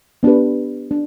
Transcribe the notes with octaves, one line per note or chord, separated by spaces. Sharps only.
B3 D4 G4 B4
D4